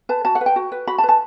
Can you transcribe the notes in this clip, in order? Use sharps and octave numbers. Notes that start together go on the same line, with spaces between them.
B4 A5
F#4 A5
F#5
B4
G5
F#4
B4
F#4 B5
A5
B4
A5